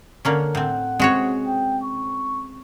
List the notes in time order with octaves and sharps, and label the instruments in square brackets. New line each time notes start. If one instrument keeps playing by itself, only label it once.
[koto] D3 A#3 C#4
[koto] A2 C4 [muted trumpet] F#5
[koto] G#3 F#4 C#5 [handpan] C4 C#4 G#4
[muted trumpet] G5
C#6